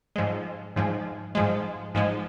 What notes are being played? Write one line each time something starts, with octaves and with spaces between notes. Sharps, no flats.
G#2 F3 G#3
G#2 F3 G#3
G#2 F3 G#3
G#2 F3 G#3